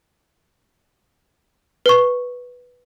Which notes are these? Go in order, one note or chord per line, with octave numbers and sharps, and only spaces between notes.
B4 C#6